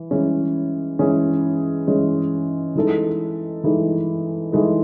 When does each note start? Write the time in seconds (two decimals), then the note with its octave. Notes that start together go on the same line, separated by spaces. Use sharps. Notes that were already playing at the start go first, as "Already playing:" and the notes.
Already playing: E3
0.11 E3 G#3 C#4 G#4
0.99 E3 G#3 C#4 G#4
1.87 E3 G#3 C#4 G#4
2.75 E3 G#3 D#4 A4
3.64 E3 G#3 D#4 A4
4.52 E3 G#3 D#4 A4